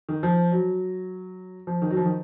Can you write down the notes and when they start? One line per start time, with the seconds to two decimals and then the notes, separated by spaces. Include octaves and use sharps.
0.09 D#3
0.23 F3
0.52 F#3
1.67 F3
1.82 D#3
1.91 F#3
1.97 F3
2.05 D#3